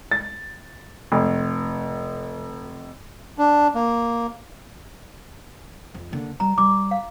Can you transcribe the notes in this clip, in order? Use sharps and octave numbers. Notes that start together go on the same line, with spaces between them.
A6
F1
D4
A#3
F2
D3 A#3
G3 A#5
G3 D6
F5